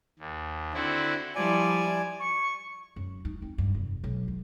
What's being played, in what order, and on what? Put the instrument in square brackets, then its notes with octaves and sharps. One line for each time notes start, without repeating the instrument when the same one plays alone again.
[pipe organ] D#2
D3 C4 E4 F#4
[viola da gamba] F3 G3 E4 [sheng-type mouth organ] D5 G#5
[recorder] C#6
[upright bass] F#2
D#4
C4
G2
F1
B1
D#3